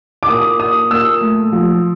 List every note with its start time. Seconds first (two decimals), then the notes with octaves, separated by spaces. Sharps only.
0.23 D6
0.28 A#2 D#6
0.59 A#2 D#6
0.90 A#2 E6
1.21 A3
1.52 F3